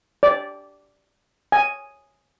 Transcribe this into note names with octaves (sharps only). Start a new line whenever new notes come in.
D5
G#5